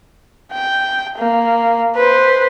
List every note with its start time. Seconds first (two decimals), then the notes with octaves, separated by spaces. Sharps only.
0.53 G5
1.18 A#3
1.96 B4 C5